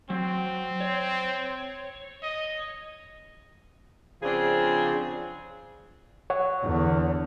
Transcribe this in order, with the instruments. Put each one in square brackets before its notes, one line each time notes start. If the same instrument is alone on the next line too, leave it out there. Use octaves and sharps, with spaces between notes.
[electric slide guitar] F#3 [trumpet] C4
[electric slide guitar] C#5
[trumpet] D#5
[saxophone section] C#3 F3 C4 D4 G#4
[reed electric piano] C#5 F#5
[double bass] E2 D3